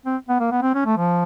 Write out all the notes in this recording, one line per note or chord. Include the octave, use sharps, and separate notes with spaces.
C4
B3
A#3
B3
C4
C#4
A3
F3